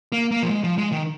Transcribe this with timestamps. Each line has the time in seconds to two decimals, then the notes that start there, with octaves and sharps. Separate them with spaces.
0.12 A#3
0.32 A#3
0.43 F3
0.50 G#3
0.64 F3
0.78 G#3
0.92 D#3